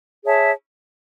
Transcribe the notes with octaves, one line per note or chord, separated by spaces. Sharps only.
G#4 C#5 E5 A5